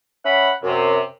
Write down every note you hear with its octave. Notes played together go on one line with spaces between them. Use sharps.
C#4 E5 F#5 B5
F#2 C3